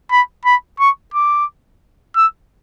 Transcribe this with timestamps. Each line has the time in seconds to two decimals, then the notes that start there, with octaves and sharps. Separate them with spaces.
0.11 B5
0.45 B5
0.80 C#6
1.14 D6
2.16 E6